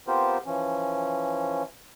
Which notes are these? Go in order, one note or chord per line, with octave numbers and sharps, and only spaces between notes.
B3 C4 F4 G4 A#4 C5
E3 F3 C#4